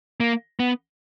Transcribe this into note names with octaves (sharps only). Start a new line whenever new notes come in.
A#3
B3